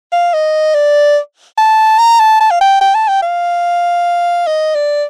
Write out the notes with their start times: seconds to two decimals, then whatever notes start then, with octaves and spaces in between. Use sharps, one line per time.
0.12 F5
0.34 D#5
0.74 D5
1.58 A5
1.99 A#5
2.20 A5
2.40 A5
2.51 F5
2.61 G5
2.81 G5
2.95 A5
3.08 G5
3.22 F5
4.47 D#5
4.75 D5